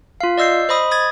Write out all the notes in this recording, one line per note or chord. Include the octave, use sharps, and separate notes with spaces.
F4 F5
D5 D#5 E6 G6 C7
C5 D#5 B5 D#6
D#6 G#6 A6